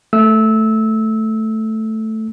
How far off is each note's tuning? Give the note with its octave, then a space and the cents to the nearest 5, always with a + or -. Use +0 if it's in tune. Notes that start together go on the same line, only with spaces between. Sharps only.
A3 +0 E6 -20